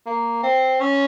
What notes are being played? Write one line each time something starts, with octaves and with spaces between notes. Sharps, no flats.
A#3
C4
C#4